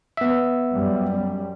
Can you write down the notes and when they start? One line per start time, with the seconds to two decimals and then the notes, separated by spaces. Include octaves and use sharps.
0.17 B3 E5
0.72 F#2 G3